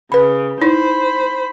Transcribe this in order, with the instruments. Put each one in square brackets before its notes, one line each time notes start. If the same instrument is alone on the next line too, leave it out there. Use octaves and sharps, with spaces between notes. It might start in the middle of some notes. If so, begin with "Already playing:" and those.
[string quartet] C#3 [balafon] B4 B5
[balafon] D#4 E4 [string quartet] C5 B5